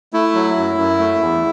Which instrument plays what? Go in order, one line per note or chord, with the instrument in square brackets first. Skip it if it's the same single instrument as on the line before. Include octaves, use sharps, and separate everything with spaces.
[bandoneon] A3 E4
F#3
F#2
F#2
A3
E2